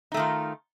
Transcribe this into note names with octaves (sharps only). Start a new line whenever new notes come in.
D#3 A3 D#4 F4